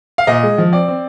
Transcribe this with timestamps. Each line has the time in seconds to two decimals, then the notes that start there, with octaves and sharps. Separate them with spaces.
0.18 F5
0.27 A#2 D#5
0.43 G#3
0.58 F3
0.73 C4 D5
0.88 C4